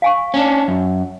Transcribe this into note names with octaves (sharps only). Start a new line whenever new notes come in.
F5 G#5 C#6
C#4 D4
F#2